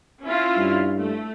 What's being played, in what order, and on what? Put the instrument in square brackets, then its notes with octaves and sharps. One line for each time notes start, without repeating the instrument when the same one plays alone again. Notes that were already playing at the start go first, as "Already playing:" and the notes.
[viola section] C#4 E4 F4
[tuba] G2
[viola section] A3